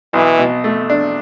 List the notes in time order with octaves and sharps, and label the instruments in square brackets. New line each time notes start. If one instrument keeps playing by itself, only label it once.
[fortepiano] B1 [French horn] E3
[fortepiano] B2
A3
D4